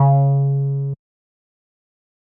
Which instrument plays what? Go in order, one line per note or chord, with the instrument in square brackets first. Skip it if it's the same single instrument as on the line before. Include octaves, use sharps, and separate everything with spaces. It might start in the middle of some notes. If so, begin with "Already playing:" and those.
Already playing: [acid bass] C#3